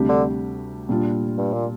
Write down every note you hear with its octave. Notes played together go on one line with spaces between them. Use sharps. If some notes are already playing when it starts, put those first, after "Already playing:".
Already playing: D2 C3 G3 D4 G4
D3
A#2 G3 D4 F4
G2
A#2